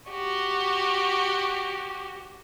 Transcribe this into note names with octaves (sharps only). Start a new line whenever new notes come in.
F#4 G4